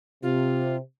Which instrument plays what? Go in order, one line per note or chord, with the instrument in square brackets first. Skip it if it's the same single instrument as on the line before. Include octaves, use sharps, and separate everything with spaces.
[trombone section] C3 [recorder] F4